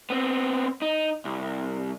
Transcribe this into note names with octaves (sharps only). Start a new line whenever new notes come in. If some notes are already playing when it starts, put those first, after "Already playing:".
B3 C4
D#4
C2